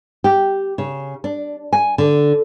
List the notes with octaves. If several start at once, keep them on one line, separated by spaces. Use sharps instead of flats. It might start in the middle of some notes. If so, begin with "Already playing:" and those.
G4
C#3
D4
G#5
D3